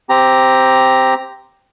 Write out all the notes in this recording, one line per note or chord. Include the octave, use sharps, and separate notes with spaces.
C4 G4 A#5